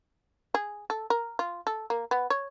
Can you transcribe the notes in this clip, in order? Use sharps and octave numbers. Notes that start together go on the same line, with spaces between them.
G#4
A4
A#4
F4
A4
A#3
B3
C#5